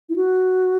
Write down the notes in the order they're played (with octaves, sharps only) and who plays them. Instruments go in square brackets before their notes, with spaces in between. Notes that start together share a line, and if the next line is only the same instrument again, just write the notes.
[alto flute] E4
F#4